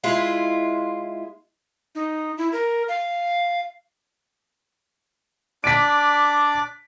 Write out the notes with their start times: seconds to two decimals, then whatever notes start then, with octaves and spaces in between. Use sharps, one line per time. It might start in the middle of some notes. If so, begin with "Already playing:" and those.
0.04 G#3 E4 F4
1.95 D#4
2.38 E4
2.53 A#4
2.88 F5
5.64 D4 D5 D6 B6 D7